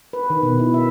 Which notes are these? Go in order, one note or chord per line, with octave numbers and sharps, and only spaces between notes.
B4
D#3
B2
E4
E5